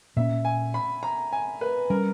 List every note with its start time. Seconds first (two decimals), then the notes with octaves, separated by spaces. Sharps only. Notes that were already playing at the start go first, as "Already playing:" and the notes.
0.16 A#2 A#3 C#4 E5
0.45 G#5
0.74 B5
1.03 A#5
1.33 G#5
1.61 B4
1.90 G3 C#4 A#4